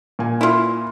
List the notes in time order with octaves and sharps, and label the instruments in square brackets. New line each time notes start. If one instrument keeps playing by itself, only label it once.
[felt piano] A#2 G#5
[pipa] E4 F4